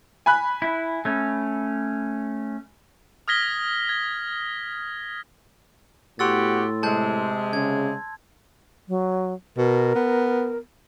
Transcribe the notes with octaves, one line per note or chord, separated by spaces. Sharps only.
G#5 B5 F#6
E4
A3 C#4
D#6 F6 G#6 A#6 B6 G7
G#6
A2 B3 F#4 G4 C6 E6 A6
C3 G#3 A5 G6
C#3 G#6
F#3
B2 A#4
B3